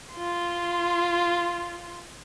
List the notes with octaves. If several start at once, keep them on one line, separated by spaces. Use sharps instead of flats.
F4 C6